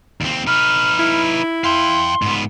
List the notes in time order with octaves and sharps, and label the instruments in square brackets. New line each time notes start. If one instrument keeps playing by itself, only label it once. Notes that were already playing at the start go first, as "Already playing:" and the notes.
[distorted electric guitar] D#2 C4
[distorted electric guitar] D#4 B4 [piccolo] F6
[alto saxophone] E4
[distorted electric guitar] F5 G5 [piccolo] C6
[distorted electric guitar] G#2 B3